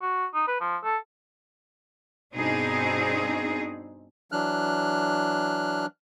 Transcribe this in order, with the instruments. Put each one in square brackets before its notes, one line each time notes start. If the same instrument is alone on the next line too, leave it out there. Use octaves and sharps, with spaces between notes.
[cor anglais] F#4
D#4
B4
F3
A4
[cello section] G2 B2 C4 D4 D#4 G#4
[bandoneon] E3 F#3 D4 F6 F#6